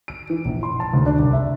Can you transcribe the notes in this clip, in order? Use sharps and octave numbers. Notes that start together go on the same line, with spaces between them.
D7
E3
A#1
C6
A5
D2
D4
C2
E5